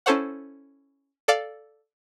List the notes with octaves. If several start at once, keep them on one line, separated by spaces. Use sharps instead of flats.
C#4 E4 A4 C5 C#5 F#5
A4 D5 F5